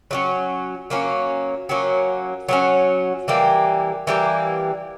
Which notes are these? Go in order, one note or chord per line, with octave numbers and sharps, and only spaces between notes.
F#3 A#3 C#4
F#3 A#3 C#4
F#3 A#3 C#4
F#3 A#3 C#4
E3 G3 A#3
E3 G3 A#3